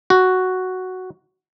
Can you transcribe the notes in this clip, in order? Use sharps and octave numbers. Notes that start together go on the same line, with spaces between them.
F#4